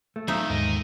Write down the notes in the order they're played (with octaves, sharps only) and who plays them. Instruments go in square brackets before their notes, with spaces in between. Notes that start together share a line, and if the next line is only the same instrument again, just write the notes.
[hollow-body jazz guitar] A3
[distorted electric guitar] G2 D#3 [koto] F3 D#4 E5 [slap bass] F#3 B3
[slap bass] D#2 D3 G#3 [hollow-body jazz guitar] G#2 [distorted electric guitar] A#4 D#5